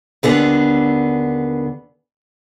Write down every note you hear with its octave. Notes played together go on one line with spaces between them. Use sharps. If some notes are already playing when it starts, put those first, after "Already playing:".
D#2 D3 B3 G#4